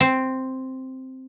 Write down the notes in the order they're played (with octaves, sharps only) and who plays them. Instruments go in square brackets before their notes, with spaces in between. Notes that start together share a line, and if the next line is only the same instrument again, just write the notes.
[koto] C4